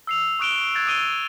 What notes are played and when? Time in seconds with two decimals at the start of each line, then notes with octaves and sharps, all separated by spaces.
0.07 E6 C7 F7
0.39 C#6 D#6 F#6 D7 E7 G7
0.75 F#6 G#6 A6
0.87 D#6 D7 D#7 G7